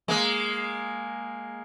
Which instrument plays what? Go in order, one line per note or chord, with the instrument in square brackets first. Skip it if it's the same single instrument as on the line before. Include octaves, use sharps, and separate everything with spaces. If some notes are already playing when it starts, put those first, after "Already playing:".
[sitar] G#3 A#3